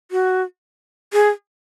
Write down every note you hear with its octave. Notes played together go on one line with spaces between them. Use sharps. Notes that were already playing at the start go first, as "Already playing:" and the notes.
F#4
G#4